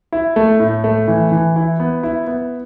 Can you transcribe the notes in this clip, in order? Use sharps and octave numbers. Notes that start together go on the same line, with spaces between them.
E4
A3
A2
A3
E3
E3
E4
B3
E4
B3